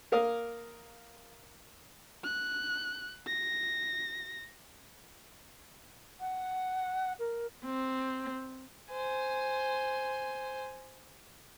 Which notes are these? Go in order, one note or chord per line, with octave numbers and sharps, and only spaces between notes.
A#3 A#4 F5 D#6
F#6
A#6
F#5
A#4
C4
C5 G#5